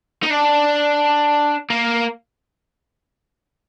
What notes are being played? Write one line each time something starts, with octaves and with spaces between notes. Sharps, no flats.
D#4
D4
A#3